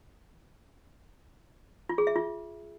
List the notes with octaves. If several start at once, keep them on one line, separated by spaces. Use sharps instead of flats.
F4
G#4
E5
F4